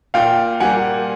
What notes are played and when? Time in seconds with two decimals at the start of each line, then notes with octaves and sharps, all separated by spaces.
0.14 A#2 F5 G5
0.60 G3 A#3 F#5 G#5